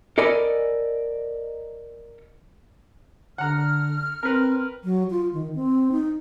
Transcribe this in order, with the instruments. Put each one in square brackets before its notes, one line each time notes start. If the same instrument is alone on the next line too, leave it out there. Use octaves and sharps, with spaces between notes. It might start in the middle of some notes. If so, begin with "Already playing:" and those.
[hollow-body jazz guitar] A4 A#4 D5 D#5 G#5 B5
[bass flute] D3 [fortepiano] F#5 A#5 [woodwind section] F6
[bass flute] C4 [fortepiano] A#4 B4
[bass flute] F#3
F4
D#3
C4
D#4